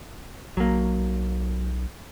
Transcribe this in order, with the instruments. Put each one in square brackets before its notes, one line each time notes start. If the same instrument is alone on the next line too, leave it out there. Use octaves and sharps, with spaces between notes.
[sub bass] B1 [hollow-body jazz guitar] F#3 A#3